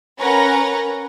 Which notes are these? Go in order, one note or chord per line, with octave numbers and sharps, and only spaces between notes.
C#4 A#4 B4 F#5 A#5